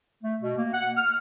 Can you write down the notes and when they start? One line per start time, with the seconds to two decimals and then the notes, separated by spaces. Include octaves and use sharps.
0.24 A3
0.40 B2
0.57 A#3
0.73 F#5
0.97 F6